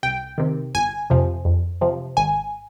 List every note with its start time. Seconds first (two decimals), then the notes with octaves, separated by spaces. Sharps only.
0.03 C2 G5
0.38 C3 D#3
0.74 G1 G#5
1.10 F2 C3 F3
1.45 F2
1.81 C3 F3
2.17 G#1 G#5